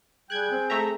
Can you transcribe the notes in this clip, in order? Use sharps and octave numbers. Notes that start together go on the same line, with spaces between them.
G3 G#4 G5 F#6 G#6
C4
A3 E5 A#5